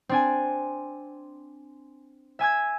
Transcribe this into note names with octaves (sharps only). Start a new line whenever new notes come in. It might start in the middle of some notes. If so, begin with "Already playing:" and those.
C4 D4 G#5
E5 G#5 E6 G#6